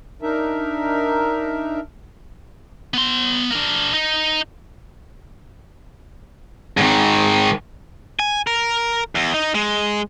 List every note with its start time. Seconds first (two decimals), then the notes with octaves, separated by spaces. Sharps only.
0.22 D4 D#4 A#4 E5
2.94 B3 C6
3.51 D4 A#4
3.94 D#4
6.77 G#2 D#3
8.20 G#5
8.47 A#4
9.15 E2
9.34 D#4
9.55 G#3